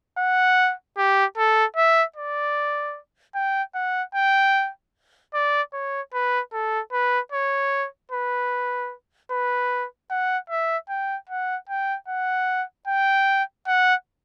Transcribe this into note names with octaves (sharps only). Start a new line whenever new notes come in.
F#5
G4
A4
E5
D5
G5
F#5
G5
D5
C#5
B4
A4
B4
C#5
B4
B4
F#5
E5
G5
F#5
G5
F#5
G5
F#5